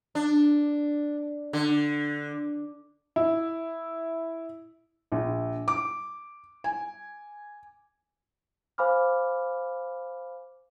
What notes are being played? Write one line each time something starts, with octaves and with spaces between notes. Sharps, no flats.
D4
D3
E4
A#1
D6
G#5
C5 F5 G#5 B5 D6 F6